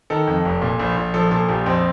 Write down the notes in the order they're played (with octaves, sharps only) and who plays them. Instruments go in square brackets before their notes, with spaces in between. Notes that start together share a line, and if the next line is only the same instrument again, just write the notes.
[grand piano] D#3 A4
F2
F1
A#2
A#1
A#1
F3 A4
A#2 A4
A#1 G4
F2 C4